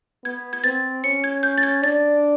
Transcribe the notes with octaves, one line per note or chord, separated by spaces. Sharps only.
B3 G#6
G#6
C4 A6
C#4 C#7
G#6
G6
A6
G#6
D4 A6